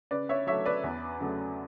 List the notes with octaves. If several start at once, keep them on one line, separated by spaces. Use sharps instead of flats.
C#3 B4 D5
C#5 E5
F#3 A3 C#5 E5
B4 D5
E2
C#3 F#3 A3